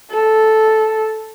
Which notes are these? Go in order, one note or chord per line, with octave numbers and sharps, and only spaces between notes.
A4